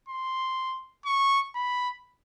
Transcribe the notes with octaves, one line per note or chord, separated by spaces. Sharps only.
C6
C#6
B5